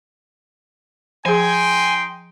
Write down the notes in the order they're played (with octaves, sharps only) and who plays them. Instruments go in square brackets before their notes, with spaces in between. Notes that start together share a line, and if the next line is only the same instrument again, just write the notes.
[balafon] F3 G#4 [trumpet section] D#4 G5 C6 [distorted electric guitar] G#5